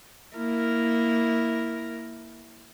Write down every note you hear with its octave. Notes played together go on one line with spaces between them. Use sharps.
A#3 E4 A#4